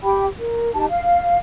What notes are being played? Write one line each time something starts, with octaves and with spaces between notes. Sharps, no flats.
G4 G5 B5
A#4
D#4 G4 A5
F5